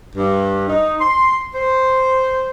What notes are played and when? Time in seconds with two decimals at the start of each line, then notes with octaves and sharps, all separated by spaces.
0.16 G2
0.68 D#4
1.00 C6
1.55 C5